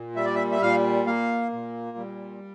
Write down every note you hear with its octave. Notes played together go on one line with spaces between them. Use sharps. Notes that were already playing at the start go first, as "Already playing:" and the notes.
Already playing: A#2
G3 E5
D5
E5
E5
A#2 F5
A#3 F5
A#2
G3